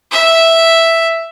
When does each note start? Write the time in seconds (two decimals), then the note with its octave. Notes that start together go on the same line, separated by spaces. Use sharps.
0.11 E5